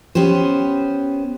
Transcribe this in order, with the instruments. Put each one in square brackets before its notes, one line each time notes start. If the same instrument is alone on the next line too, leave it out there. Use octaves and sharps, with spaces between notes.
[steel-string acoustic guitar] B3 C#4 G4 C5